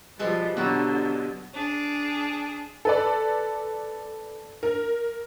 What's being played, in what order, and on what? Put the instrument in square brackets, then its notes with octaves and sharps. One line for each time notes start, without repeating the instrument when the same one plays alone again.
[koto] B2 G#3 A4 [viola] F3 G3
[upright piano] B2 F#3 [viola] D3 [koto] G3 F4 F#4
[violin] D4 G#4
[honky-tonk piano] A4 B4 D5
A#4